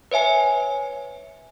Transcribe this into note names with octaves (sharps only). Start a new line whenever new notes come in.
B4 C#5 E5 G#5 C#7